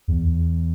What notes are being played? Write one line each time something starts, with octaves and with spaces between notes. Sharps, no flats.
E2